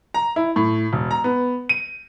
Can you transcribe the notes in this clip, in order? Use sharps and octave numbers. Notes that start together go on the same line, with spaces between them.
A#5
E4
A2
E1
A#5
B3
D#7